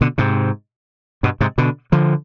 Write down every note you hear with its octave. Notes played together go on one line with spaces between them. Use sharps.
B2 D3
G#2 C3
G2 B2
G#2 C3
B2 D3
D3 F3